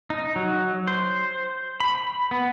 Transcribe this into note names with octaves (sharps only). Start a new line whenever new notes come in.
D#4
F#3
C5
B5
B3